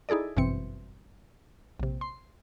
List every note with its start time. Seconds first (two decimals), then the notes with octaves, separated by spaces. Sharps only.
0.09 D#4 E4 G#4 A4 D5
0.37 G1 F#2 B2 E3 C4 C#7
1.80 A#1 C3
2.01 C6